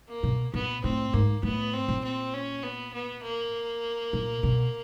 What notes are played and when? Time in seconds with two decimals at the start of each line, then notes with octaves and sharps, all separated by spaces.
0.09 A#3
0.23 B2
0.54 A#2 B3
0.84 A2 C4
1.14 G#2 A#3
1.43 A2 B3
1.73 C4
1.88 A#2
2.04 C4
2.34 C#4
2.63 B3
2.93 B3
3.23 A#3
4.13 A#2
4.43 B2